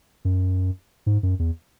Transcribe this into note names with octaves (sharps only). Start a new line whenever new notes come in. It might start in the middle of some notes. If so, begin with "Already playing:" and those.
F#2
G#2
F#2
E2